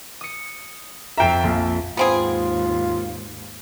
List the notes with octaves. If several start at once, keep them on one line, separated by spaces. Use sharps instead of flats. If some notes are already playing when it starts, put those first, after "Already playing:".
D#6 C#7
F2 F4 E5 G5 A#5
A#1
D#2 G#2 B3 C4 F4 G#4